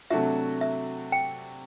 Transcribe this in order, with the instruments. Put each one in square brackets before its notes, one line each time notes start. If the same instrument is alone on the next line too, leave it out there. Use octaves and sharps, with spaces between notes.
[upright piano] C3 F#3 A3 D4 F#4 [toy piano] E5
[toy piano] E5
G5